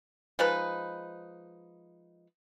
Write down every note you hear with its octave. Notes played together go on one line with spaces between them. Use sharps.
F3 G#3 D#4 B4